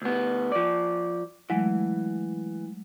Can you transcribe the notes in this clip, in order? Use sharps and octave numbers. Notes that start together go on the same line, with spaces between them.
D2 B3
F3 D5
E3 F#3 G#3 A3